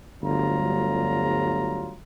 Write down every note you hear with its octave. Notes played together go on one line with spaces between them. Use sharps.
G1 D2 F#3 G3 F4 A#5